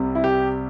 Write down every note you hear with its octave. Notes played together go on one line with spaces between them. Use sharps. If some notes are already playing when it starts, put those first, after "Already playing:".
Already playing: C2 C3 G3
E4
G4